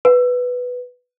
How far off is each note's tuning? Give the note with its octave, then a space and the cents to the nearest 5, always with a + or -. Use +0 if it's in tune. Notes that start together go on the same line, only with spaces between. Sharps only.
B4 +0